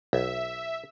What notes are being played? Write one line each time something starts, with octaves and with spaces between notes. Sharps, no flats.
B1 E5